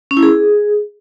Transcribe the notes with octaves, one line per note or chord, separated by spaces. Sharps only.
C#4
E4
G#4